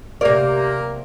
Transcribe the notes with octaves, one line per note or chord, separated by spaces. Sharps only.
C3 A#3 G4 A#4 D5